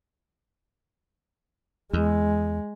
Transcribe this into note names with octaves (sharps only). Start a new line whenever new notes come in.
E2 G#3